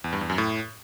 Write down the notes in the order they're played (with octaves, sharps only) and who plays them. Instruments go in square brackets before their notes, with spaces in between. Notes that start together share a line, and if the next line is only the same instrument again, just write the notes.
[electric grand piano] E2
G2
E2
F#2
A2